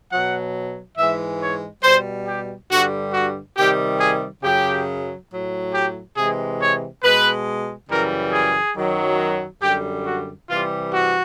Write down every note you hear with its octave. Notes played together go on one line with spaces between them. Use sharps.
B2 F#3 F#5
G#2 E3 G#3 E5
C#5
B2 G3 C5
G4
G2 D3 G3 F#4
F#4
C3 D#3 G3 G4
G#4
F#2 C#3 F#3 G4
A2 F#3
G4
C3 E3 G#3 G#4
C#5
B2 G#3 B4
F#2 C#3 E3 G3 A#4
G#4
F#2 D#3 F#3
F#2 D3 G3 G4
F#4
C3 E3 G3 F4
F#4